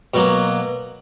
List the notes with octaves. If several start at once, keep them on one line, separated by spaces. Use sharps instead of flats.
B2 F#3 A#3